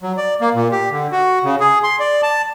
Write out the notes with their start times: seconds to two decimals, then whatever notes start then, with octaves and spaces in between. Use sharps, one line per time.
0.03 F#3
0.17 D5
0.41 A#3
0.54 A#2
0.72 G4
0.91 D3
1.12 F#4
1.44 C#3
1.60 G#4
1.84 C6
2.00 D5
2.23 A5